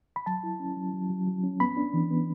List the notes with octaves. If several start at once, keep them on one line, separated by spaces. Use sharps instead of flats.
B5
F#3 A5
E4
C#4
F#3
F#3
F#3
F#3
C#4
B3 B5
D4
E3
B3